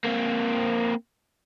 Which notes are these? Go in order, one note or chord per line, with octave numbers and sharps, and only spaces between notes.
A#3 C4